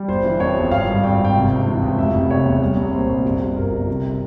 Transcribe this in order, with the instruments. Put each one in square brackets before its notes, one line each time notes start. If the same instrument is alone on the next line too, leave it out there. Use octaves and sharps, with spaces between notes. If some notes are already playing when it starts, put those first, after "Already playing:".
Already playing: [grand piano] G3
G1 C5
E3
F2 C#5
G1
G#1 F5
G3
G#1 G5
G#1 G5
C3
C#2
E3
C#2
F1 E5
F1
C3 C#5
E2
G3
C2
A#2 C5
C2
G1
G1
G1 A#4
G1
C3